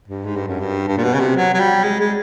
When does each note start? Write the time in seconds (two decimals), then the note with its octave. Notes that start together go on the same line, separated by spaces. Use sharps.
0.08 G2
0.25 G#2
0.36 G2
0.48 F#2
0.60 G2
0.88 G2
0.97 A#2
1.04 B2
1.14 C#3
1.20 C3
1.36 F#3
1.54 F#3
1.59 G3
1.84 G#3
2.00 G#3